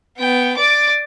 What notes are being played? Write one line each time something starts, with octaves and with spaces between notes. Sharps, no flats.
B3 G5
D5 D6